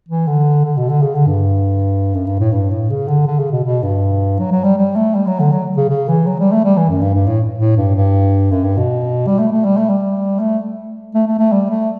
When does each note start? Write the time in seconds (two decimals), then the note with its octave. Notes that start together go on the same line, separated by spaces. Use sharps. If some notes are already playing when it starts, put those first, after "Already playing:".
0.08 E3
0.27 D3
0.64 D3
0.77 B2
0.89 D3
1.02 C#3
1.15 D3
1.27 G2
2.14 F#2
2.27 G2
2.39 A2
2.52 G2
2.71 A2
2.90 C#3
3.08 D3
3.27 D3
3.39 C#3
3.52 B2
3.64 B2
3.83 G2
4.39 F#3
4.51 F#3
4.64 G3
4.77 G3
4.96 A3
5.15 G3
5.27 F#3
5.39 D3
5.52 F#3
5.77 C#3
5.89 C#3
6.08 E3
6.27 F#3
6.40 G3
6.52 A3
6.64 G3
6.77 E3
6.89 F#2
7.02 G2
7.14 G2
7.26 A2
7.58 A2
7.77 G2
7.95 G2
8.51 F#2
8.64 G2
8.77 B2
9.27 G3
9.39 A3
9.52 A3
9.64 G3
9.77 A3
9.89 G3
10.39 A3
11.14 A3
11.27 A3
11.39 A3
11.52 G3
11.70 A3